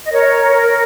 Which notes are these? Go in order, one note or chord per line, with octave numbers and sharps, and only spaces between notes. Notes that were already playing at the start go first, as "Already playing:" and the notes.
D#5
A#4 C#5
A#4